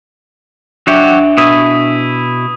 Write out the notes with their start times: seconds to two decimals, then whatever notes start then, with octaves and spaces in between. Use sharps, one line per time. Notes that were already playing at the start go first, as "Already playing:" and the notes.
0.87 F#3 D4 F#4 G4 E5
1.38 B2 E4 D#6 D#7